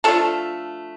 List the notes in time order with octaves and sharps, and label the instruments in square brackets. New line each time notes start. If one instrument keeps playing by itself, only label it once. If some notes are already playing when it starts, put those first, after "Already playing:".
[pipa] F3 A3 D4 F4 A4 A5